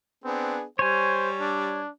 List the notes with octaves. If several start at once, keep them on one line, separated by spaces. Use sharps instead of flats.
B3 C4 D4 G#4
G3 C5 C#5 G#5
D4